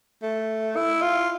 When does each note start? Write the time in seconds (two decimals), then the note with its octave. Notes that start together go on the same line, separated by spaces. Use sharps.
0.23 A3
0.76 E4
1.02 F4